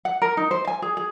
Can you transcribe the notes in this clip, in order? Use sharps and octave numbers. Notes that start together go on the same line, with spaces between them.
F#5
A#4
D#4
C5
G#5
G#4
G#4